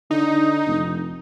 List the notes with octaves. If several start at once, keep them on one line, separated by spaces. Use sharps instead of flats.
D3 D#4
F1